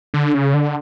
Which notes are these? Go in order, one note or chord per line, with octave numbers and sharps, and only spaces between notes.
D3
C#3
D3